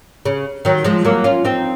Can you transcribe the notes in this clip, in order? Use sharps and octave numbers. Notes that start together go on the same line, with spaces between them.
C#3
D#3 F#3
F3 G#3
F#3 A#3
C#4 F4
C4 D#4